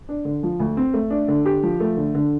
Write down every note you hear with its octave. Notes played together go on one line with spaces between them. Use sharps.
D4
D3
F3
D2
C4
A3
D4
D3
G4
F3
A3
D3
D3